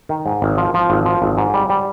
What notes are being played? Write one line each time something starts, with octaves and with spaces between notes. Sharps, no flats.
D#3
G#2
G#1
F3
F3
G#1
F3
G#1
G#2
G3
G3